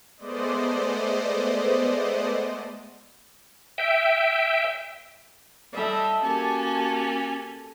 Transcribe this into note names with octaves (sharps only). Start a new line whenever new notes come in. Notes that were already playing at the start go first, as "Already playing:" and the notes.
G#3 A3 B3 C5 D5 D#5
E5 G5
G3 A4 D#5 E5
A#3 C#4 F#4 G4 G#5 A5